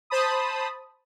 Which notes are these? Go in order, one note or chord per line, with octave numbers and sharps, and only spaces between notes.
C5 A5 B5 D#6